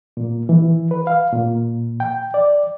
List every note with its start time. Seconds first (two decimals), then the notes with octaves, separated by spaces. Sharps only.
0.17 A#2
0.49 E3
0.91 B4
1.07 F5
1.33 A#2
2.00 G5
2.34 D5